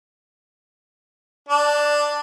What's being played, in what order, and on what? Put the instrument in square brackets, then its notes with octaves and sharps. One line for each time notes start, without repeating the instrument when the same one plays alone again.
[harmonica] D4